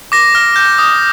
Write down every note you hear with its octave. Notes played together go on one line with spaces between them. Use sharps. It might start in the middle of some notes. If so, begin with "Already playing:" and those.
D6 A#6
F6
G6
D#6